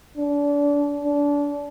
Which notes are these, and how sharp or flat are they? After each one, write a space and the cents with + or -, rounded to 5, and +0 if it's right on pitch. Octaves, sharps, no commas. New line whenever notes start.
D4 -30
D4 -25